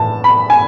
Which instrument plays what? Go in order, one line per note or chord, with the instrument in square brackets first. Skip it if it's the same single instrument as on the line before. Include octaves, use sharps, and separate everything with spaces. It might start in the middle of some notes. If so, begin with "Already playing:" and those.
Already playing: [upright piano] A2 E3 A5
B5
G#5